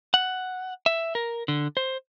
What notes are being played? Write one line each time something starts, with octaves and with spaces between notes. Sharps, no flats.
F#5
E5
A#4
D3
C5